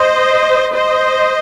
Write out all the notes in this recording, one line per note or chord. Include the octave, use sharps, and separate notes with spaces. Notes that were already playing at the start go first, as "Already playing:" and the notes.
Already playing: C5 D#5
C5 D#5